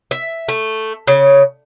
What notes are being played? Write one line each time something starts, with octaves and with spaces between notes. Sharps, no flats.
E5
A3
C#3